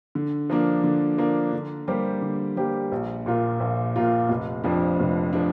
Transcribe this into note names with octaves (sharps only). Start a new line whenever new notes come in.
D3
F3 A#3 D4
D3
F3 A#3 D4
D3
G3 A#3 G4 C5
D3
G3 A#3 G4 C5
A#1
A#2 A#3 F4
A#1
A#2 A#3 F4
F1
F2 F3 D4
F1
F3 D4